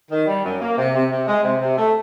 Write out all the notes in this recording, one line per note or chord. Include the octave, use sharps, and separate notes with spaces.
D#3
G3
F#2
A#3
C3
C3
C3
G#3
C3
C3
A3